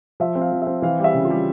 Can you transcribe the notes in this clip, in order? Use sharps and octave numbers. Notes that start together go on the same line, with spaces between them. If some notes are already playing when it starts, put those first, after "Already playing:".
F3 E5
C4
F5
F3
C4 E5
E3 F5
G3
E5
C#3
F4
G3